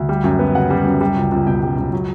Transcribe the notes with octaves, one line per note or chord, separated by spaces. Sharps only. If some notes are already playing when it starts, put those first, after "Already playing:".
Already playing: D2
G3
F#2
B3
C#3 F#5
G3
F#2
G3
C#2
C#2
B2 G5
G3
C#2
F#3